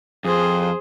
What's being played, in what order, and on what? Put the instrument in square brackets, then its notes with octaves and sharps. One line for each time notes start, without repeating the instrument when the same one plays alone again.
[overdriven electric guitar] F2 [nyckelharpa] G#4 C5